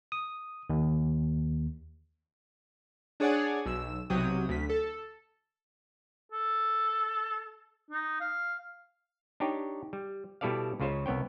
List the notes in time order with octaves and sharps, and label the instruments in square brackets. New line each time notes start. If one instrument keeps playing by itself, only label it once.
[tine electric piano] D#6
D#2
[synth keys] D4 G#4 C#5 D5 F#5 G#5
B1 E6 E7
B1 C3 F#3 G5 D#6
D2 B6
A4
[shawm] A4
D#4
F5
[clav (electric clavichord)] D4 D#4 G4 C#5
G3
B2 G3 E4 A4 D5 F5
C#2 C#3 F4 C5 C#5
C2 B3 C#5 G5